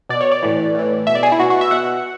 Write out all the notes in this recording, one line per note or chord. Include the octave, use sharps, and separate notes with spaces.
B2 D5
C#5
D5
A2 E3
A2 E3
B2 E5
D5
G#4
E4
B2 F#4
F#4
E5
B2 F#5